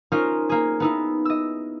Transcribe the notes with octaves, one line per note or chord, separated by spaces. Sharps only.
C#4 D#4 F4 A#4 C5
A#3 G#4
B3 D#4 E4
D#5 E6